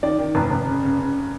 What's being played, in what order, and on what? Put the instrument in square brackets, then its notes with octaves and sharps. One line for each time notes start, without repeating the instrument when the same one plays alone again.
[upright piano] D#3 D5
D#3
F1
F1
C#3
C#3
C#3